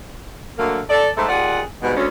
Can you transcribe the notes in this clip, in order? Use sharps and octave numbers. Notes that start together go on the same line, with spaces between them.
D3 F#3 A3 A#3
A4 D5
G#2 A3 A4
D#2 F4 G#4 D5 F#5
G#2 B2 G3 G#3 B3 F#4
D2 C#4